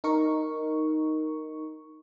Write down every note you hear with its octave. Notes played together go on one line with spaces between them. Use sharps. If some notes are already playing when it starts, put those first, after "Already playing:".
D#4 A#4 C#6